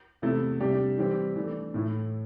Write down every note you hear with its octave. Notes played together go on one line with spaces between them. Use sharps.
E2 C3 A3 E4
C3 G3 D4 G4
E3 G3 C4 G4
E3 A3 D4
A2 A3 E4